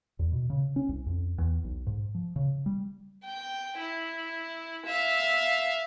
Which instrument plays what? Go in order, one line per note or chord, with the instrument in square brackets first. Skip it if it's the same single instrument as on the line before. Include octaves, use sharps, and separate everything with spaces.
[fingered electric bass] E2
B2
C#3
C#4
C2
F2
E2
B1
G#2
F3
C#3
G3
[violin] G5
E4
E5 F5